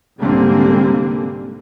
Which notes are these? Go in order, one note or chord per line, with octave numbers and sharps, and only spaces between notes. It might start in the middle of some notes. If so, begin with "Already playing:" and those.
C2 G#2 D3 G3 A#3 C4